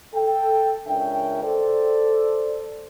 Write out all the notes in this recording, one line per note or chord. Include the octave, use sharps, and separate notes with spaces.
A4 G5
C#2 C#4 D4 A#4 E5 G5
A4 C5 D5